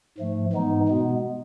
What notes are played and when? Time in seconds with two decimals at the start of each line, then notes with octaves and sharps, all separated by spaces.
0.18 G#2 F3 A3
0.53 G#2 E3 G#3 B3 D#4
0.88 B2 G#3 B3